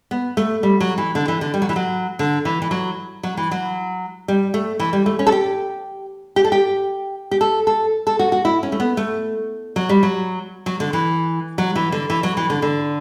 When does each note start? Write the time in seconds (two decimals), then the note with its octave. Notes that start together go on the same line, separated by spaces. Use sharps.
0.11 B3
0.37 A3
0.63 G3
0.80 F#3
0.98 E3
1.15 D3
1.28 E3
1.41 D3
1.54 G3
1.62 F#3
1.69 E3
1.76 F#3
2.19 D3
2.45 E3
2.62 E3
2.71 F#3
3.23 F#3
3.37 E3
3.51 F#3
4.28 G3
4.54 A3
4.80 E3
4.93 G3
5.06 A3
5.19 C#4
5.27 A4
5.32 G4
6.36 G4
6.44 A4
6.52 G4
7.31 G4
7.41 A4
7.67 A4
8.07 A4
8.19 F#4
8.32 F#4
8.45 E4
8.63 C#4
8.72 A3
8.80 B3
8.97 A3
9.76 F#3
9.89 G3
10.03 F#3
10.66 F#3
10.80 D3
10.93 E3
11.58 F#3
11.76 E3
11.92 D3
12.10 E3
12.23 F#3
12.37 E3
12.50 D3
12.62 D3